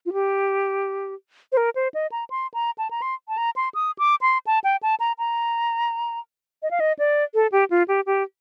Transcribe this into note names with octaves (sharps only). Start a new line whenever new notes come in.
F4
G4
C5
A#4
C5
D#5
A#5
C6
A#5
A5
A#5
C6
A5
A#5
C6
D#6
D6
C6
A5
G5
A5
A#5
A#5
D#5
F5
D#5
D5
A4
G4
F4
G4
G4